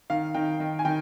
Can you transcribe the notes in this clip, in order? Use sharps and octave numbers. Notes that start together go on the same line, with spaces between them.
D#3 F5
D#3 G5
D#3
G#5
D#3 G5